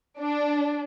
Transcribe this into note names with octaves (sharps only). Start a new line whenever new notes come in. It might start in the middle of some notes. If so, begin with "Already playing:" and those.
D4